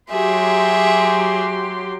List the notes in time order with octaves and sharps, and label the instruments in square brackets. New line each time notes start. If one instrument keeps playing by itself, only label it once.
[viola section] F#3 G4 C6 [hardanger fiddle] G#4 E5